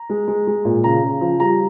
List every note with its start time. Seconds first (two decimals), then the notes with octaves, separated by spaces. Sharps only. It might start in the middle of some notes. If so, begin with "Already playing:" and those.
Already playing: A#5
0.10 G#3
0.28 G#3
0.47 G#3
0.65 A#2
0.84 C#3 A#5
1.03 C#3
1.21 F3
1.40 G3 A#5